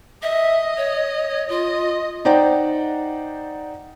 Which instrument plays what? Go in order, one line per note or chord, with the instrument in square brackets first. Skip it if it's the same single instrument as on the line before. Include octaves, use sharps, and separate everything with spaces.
[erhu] D#5 [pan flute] E5
[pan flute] C#5
[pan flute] F4 [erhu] D#5
[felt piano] D#4 C5 D5 F#5 G5 A#5